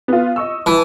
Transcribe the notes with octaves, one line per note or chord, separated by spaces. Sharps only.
B3 F4
D#5 C#6 E6
E3 A5